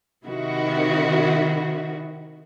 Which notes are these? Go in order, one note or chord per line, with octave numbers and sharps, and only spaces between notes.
C3 D#3 E4 F#4